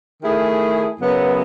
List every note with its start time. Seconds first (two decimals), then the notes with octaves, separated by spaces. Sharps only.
0.22 D#3 A3 E4 G#4
1.00 F#2 C#3 F#3 B3